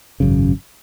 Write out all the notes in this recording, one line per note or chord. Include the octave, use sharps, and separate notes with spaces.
G#1 F#2 C#3